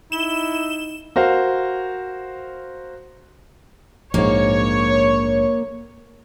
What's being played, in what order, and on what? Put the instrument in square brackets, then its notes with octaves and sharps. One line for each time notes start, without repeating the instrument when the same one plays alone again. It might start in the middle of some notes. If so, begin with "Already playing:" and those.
[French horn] D#4 [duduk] E4 [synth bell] E7 G7
[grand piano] F#4 A#4 C5 F5
[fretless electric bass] A#1 G#2 [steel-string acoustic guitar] A#3 [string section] C#5